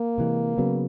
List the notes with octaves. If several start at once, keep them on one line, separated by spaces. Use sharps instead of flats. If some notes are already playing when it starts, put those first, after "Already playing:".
Already playing: A#3
C3 E3 G#3
C#3 F#3 B3